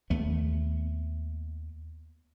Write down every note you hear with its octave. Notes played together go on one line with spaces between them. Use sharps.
D#2 A3 B3